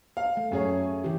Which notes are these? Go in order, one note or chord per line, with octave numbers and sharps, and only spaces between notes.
F5
A3
F#2 A3 G#4 C#5
E3 G4